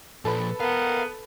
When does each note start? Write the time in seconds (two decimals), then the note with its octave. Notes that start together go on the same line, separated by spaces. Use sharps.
0.25 A#2 F3 A4 B4
0.60 B3 A#4 F5 F#5